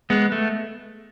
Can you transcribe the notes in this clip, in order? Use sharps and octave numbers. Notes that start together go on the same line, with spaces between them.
G#3 B3
A3